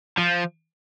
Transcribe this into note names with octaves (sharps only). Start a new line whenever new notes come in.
F3